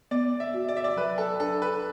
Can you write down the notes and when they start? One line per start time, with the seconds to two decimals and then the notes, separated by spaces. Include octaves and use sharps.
0.11 B3 D5
0.40 E5
0.54 F#4
0.68 D5
0.77 E5
0.84 D5
0.96 F#3 B4
1.18 A4
1.40 D4 A4
1.62 B4